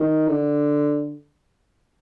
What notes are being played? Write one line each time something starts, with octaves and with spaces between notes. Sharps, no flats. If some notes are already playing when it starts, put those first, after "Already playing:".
Already playing: D#3
D3